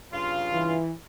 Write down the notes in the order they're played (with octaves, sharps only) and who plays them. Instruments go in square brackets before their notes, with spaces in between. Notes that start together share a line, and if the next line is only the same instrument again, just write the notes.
[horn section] G2 C#3 F4
[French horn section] E3